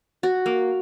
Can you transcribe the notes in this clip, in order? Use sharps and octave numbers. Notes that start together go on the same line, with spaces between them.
F#4
A#3